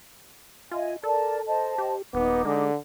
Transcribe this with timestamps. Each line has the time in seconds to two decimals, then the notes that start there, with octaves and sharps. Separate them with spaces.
0.71 F4 D#5 E5 G#5
1.03 A4 A#4 D5 A5
1.47 C5 D#5 A5
1.78 G4
2.14 D#1 B3 D#4 D6
2.45 D3 G#3